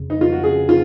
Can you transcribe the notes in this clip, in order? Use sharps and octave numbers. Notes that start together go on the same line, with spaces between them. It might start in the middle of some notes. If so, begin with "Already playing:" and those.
Already playing: F2 C#3
D#4
F2 F4
F#4
C#3 G#4
C#3 F4